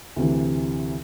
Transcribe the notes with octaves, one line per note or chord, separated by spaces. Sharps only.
D2 C3 E3